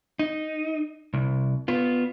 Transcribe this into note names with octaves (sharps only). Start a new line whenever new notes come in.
D#4
C2
B3 F4